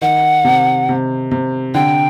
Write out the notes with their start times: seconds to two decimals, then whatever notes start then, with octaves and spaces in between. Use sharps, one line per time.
0.02 D#3 F#5
0.44 C3
0.89 C3
1.31 C3
1.74 D3 G5